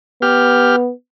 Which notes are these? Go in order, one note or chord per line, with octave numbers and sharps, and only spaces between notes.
B3 G4 F6